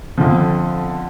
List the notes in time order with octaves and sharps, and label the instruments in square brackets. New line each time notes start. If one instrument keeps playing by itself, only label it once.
[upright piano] F2 D3 F3